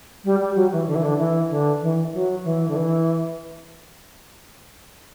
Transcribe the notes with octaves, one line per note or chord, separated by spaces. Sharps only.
G3
G3
F#3
E3
D3
E3
D3
E3
D3
E3
F#3
E3
D3
E3